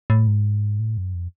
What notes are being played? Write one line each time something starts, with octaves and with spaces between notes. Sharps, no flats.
A2
G#2
A2
F#2
F2